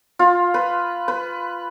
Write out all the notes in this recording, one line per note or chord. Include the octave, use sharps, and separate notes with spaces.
F4
B4
B4